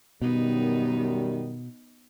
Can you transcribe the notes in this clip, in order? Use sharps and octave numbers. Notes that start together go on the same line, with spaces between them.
F#2 B2 D#3 G3 B3 D#4